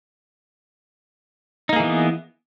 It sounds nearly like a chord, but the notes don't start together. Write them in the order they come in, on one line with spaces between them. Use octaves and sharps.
D#4 A#3 G#4 E3 B3